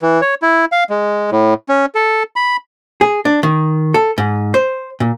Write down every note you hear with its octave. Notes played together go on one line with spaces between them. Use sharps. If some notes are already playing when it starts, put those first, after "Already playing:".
E3
C#5
E4
F5
G#3
A2
C#4
A4
B5
G#4
D4
D#3
A4
G#2
C5
A#2